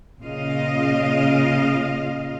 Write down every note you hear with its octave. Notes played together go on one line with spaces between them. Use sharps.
A#2 C#3 F4 D#5 F5